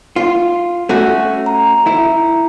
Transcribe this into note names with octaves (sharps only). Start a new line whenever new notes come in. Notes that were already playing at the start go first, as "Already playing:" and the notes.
F4
A3 C#4 F#4
A#5
E4